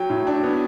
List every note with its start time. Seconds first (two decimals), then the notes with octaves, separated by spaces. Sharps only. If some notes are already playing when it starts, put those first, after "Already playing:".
Already playing: F#3 G5
0.10 A2
0.27 D4
0.43 B3